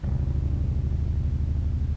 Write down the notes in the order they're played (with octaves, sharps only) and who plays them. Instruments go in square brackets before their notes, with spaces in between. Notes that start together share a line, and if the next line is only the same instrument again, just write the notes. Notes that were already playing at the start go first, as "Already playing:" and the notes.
[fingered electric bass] D#1 C2